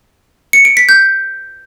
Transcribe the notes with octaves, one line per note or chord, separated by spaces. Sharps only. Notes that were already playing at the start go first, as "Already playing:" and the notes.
C#7
D7
B6
G6